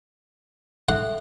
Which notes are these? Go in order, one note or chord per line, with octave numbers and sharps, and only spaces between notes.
A4 E5 F#5 C6